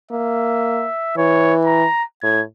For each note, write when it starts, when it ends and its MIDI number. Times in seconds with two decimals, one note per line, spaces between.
0.11 0.86 58
0.11 1.17 76
1.17 1.84 52
1.17 1.54 73
1.65 2.03 82
2.23 2.42 45
2.23 2.41 92